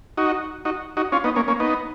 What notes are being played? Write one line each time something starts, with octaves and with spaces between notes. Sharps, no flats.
D#4 F#4
D#4 F#4
D#4 F#4
C#4 F4
B3 D#4
A#3 C#4
A#3 C#4
B3 D#4